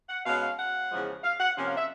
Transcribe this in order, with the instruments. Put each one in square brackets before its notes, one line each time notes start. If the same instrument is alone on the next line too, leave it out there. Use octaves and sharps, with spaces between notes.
[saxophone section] F#5
B2 G#3 C#4 F5
F5
F#5
E2 C#3 F3 G#3
F5
F#5
C3 F3 A#3 C#4
F5
E5